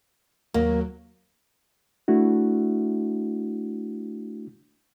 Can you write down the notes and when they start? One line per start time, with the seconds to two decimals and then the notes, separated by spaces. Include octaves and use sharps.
0.54 D#2 F#3 A#3
2.08 A3 D4 E4 F#4